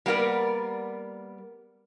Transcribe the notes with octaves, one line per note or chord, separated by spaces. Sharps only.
G3 A#3 B3 F4 A#4 D5